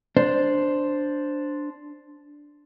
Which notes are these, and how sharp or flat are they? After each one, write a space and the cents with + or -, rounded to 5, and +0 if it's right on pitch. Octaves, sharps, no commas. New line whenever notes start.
D4 +0 C5 +0